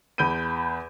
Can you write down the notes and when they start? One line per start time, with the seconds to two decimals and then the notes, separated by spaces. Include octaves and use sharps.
0.18 E2 B5 G6 D7 D#7